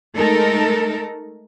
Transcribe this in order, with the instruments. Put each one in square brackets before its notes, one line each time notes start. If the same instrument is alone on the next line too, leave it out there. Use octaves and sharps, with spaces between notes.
[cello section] G#3 A3 D#4 A4 A#4